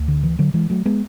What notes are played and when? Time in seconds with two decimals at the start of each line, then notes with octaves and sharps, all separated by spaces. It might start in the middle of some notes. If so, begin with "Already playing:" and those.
Already playing: D2
0.08 D3
0.23 E3
0.39 D3 F#3
0.54 E3 G#3
0.70 F#3 A3
0.86 G#3 B3